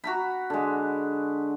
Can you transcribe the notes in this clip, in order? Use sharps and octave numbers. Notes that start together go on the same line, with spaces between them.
F#4 A#5 B5
D3 G#3